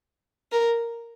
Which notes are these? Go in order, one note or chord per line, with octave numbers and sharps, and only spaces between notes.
A#4